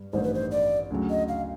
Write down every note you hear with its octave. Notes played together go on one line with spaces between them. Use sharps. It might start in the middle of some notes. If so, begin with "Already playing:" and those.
Already playing: G2 G3
A1 G2 D#3 G3 C5
B4
C5
D5
D2 C#3 F#3
D#5
F5